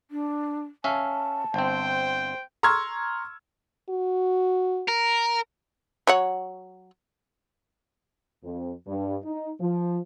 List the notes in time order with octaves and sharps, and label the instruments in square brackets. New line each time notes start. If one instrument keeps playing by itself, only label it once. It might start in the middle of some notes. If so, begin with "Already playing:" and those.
[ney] D4
[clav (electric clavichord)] C#4 E5 F5 [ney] A5
[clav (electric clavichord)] G1 C4 [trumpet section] C5 G5
[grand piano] A#5 C6 C#6 E6 F6 G#6
[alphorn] F#4
[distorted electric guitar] A#4
[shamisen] F#3 C#5 F#5
[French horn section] F2
G2
D#4
F3